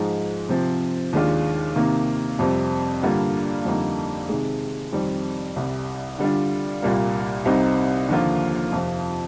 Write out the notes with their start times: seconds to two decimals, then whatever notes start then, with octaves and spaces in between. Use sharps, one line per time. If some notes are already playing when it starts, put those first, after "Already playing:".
Already playing: G#2 F3 G#3 D#4
0.49 C3 F3 C4
1.13 D#2 D#3 G#3 D4 F4
1.76 C3 D#3 A#3
2.39 F2 C3 G3 C4
3.02 G2 D3 G3 A#3 F4
3.65 F2 D3 G3 A#3 D#4
4.29 C3 D#3 G#3
4.92 F2 D#3 G3 C4
5.56 C2 C3 G3
6.18 D3 G3 D4 F4
6.82 C2 A#2 G3 A#3
7.45 C2 C3 G3 C4 D#4
8.09 D#2 D3 F3 A#3 F4
8.72 F2 C3 F3